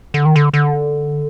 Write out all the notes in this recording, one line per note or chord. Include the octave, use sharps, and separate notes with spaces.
D3
D#3
D3
D3